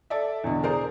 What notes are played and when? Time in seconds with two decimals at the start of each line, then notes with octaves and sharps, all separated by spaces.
0.10 A4 D5 E5
0.44 E2 B2 D3
0.63 G#4 A#4 C5 D5